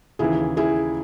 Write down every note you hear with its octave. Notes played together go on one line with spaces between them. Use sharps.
D#2 C#3 E3 E4 G#4
E4 G#4